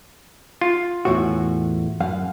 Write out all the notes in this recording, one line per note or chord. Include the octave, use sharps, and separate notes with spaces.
F4
E2 A2 F#4
F#2 F5 F#5